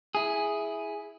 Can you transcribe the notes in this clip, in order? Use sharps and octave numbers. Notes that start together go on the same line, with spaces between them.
E4 G#4